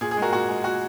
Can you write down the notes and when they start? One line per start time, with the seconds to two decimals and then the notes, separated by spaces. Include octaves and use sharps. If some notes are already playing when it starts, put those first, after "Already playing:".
0.01 A#2 G#4
0.11 G#4
0.17 G#3 F#4 A#4
0.32 A#2 F#4
0.49 G#3
0.64 A#2 F#4